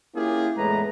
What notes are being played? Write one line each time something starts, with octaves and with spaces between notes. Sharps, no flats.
A#3 C#4 E4 F4 G4 G#4
E2 A2 G#3 B4 A#5